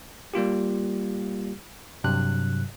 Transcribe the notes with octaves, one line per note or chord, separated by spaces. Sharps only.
G3 A#3 F4 G4
G2 C3 F#3 F#6